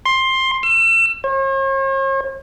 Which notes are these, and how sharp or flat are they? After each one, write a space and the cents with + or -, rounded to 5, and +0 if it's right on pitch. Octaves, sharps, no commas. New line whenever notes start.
C6 +15
E6 +35
C#5 -45